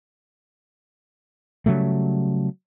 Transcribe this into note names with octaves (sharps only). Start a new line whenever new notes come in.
C#3 F#3 G3 A3